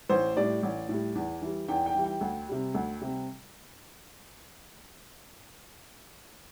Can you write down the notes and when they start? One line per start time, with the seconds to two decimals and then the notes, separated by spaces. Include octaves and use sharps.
0.09 A1 C5
0.36 A2 G3 D5
0.63 A1
0.89 A2 G3
1.15 E2
1.42 E3 G3
1.68 E2 G5
1.86 G5
1.95 E3 G3
2.04 G5
2.21 D2
2.48 C3 G3
2.75 D2
3.01 C3 G3